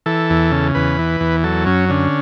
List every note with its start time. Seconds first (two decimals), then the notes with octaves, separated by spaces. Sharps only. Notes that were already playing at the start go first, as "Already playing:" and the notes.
0.06 E3 A4
0.30 E2
0.52 C#3
0.75 E2 B4
0.99 E3
1.20 E2
1.44 F#3 A4
1.66 F#2 C#4
1.89 D3 C#4